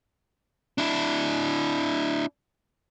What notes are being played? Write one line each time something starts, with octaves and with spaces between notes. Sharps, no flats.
D4 E4